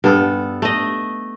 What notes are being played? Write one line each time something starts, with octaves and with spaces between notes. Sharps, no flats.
G2 B3 A4
A3 D#5